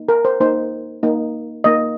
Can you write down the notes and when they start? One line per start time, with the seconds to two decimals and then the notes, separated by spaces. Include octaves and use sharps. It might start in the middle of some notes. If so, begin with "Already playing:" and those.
Already playing: A#3 D#4
0.09 A#4
0.25 C5
0.40 A#3 D#4 C5
1.03 A#3 D#4
1.64 A#3 D#4 D#5